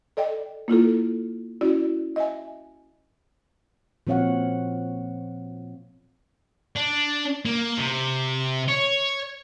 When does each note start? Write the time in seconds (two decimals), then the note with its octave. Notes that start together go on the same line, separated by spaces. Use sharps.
0.17 A4 D5 D#5 G5
0.68 A#3 E4 F4 A4
1.61 C#4 E4 F#4 D5
2.16 D#5 E5 G#5
4.07 A#2 F3 C4 C#5 F5 F#5
6.76 D4
7.45 A#3
7.78 C3
8.69 C#5